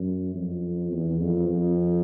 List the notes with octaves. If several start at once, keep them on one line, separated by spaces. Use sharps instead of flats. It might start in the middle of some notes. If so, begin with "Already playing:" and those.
Already playing: F#2
F2
E2
F2
F2